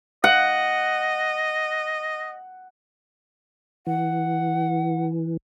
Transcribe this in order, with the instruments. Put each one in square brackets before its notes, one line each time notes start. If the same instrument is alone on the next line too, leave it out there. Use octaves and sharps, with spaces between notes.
[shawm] D#5 [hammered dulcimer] F#5
[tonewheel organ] E3 [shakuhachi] F#5